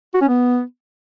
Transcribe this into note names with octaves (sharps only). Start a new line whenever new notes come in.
F#4
C#4
B3